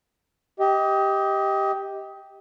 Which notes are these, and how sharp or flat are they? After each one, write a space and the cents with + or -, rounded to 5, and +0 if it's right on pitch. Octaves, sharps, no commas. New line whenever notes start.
G4 +0 D#5 +25